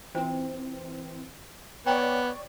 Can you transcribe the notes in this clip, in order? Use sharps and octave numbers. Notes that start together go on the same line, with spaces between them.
E3 C4 C#4 F4 C5
B3 C#5 D5 G5 A#5